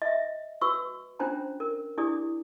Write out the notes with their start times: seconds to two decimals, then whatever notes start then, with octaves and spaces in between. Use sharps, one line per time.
0.02 D#5 E5
0.61 F#4 B4 C#6 E6
1.19 C#4 D4 F4 C5 G5 A#5
1.60 A#4
1.98 D4 E4 G4 G#4 D5 D#6